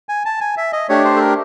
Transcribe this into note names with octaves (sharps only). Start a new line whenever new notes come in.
G#5
A5
G#5
E5
D#5
A3 D4 G4 C#5
C5
A4
A#4